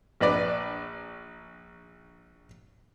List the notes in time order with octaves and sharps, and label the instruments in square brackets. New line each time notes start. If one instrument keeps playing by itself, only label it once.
[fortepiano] A#1 D4 B4 D5